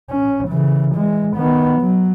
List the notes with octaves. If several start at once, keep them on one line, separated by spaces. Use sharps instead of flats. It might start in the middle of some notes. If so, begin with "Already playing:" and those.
C#4
C#3 E3
E3 G#3
D#3 B3
F#3